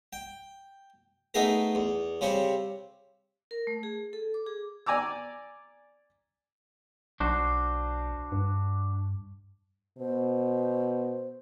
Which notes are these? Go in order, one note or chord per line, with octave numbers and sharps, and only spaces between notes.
G5
A3 B3 D#4 G#4 A#4
E2
C#3 G3 C4 C#6
A#4
A3
G#4
A4
D6
G#4
D5 G#5 A#5 D6 E6
B1 D4 F#4 C5
G2
B2 C5